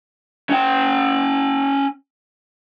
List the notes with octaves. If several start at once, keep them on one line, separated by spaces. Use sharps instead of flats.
C#4 G5